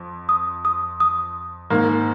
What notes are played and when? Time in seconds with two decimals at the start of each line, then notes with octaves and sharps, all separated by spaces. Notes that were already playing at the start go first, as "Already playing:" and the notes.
Already playing: F2
0.29 D#6
0.65 D#6
1.00 D#6
1.70 G#2 D#3 A#3